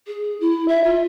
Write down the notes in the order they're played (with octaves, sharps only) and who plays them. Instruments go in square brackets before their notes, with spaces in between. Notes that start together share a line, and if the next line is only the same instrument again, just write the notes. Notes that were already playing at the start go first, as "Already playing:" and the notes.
[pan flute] G#4
E4
E5
F4